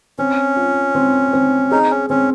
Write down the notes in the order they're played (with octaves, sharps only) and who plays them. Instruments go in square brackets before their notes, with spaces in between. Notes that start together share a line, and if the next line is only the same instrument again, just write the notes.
[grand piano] C4 [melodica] C#4
[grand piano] F4
C4
C4
[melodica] D#4 [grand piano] G#4
[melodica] C#4
[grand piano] C4 [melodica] C#4